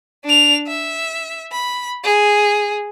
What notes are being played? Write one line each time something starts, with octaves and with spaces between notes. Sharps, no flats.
D4 F7
E5
B5
G#4